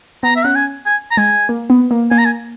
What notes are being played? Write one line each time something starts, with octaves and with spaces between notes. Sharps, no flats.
B3 A#5
E5
C#4 F#5
G#5
G#5
A#5
G#3 G#5
A#3
B3
A#3
A#3 G#5
A#5
G#5